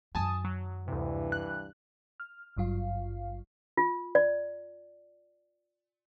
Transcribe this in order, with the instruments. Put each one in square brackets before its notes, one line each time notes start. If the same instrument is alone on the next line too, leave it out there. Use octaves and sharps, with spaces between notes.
[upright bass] F#2 D#3 [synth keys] G#5 A5 D#6
[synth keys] F#3
[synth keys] D2 C3 [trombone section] G2 E3
[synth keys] F#6
[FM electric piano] F6
G#1 G2 F#3 F4 F5
[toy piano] F4
D5